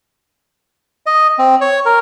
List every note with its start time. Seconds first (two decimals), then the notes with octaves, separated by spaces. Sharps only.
1.06 D#5
1.39 C4
1.61 C#5
1.86 A#4